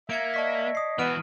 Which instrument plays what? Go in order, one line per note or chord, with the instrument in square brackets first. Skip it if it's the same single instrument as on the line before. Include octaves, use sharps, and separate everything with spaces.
[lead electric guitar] A#3 [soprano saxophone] E5 [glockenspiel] G#6 C#7 D7
[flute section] D5 D#5 [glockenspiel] A5 C#6 B6
[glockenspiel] D#6 C7
[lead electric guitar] E3 F#4 [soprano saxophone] B3 [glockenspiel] F6 D7 D#7